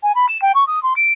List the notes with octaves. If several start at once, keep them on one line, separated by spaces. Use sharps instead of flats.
G#5
B5
E7
G5
C#6
D#6
C6
D7